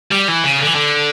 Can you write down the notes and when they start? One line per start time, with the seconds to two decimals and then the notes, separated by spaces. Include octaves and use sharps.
0.11 G3
0.28 E3
0.44 C#3
0.60 D3
0.67 E3
0.75 D3